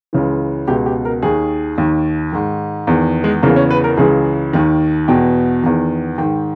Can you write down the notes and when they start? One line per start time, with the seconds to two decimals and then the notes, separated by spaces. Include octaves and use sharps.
0.13 C#2 C#3 E3
0.68 C#2 B2 G4
0.86 G4
1.05 A#4
1.23 D#2 D#3 G#4
1.78 D#2 D#3
2.33 G#2 D#3
2.87 E2 D#3
3.24 G#3
3.43 E2 C#3 E3 A#3
3.56 C#4
3.70 B4
3.84 A#4
3.97 C#2 C#3 E3 G#4
4.53 D#2 D#3
5.08 E2 B2 G5
5.63 E2 D#3
6.18 G#2 D#3 G5